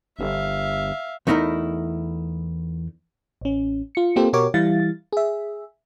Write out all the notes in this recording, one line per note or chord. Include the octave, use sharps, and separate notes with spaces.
G1 E5 F5
E2 A3 D#4 E4 A#4
A1 C#4
F4 C#7
A#3 C4 F4 G4 A4 C5
B2 F#4 G4 A#4 C#5 D6
E3 G3 E4 F5 A6
G#4 E5